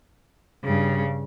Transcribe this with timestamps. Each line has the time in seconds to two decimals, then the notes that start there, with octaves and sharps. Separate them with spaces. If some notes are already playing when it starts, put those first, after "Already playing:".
0.64 G2 C#3